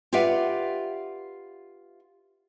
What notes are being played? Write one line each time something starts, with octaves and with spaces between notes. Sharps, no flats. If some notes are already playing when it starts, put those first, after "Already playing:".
F4 G4 B4 D5 E5 F#5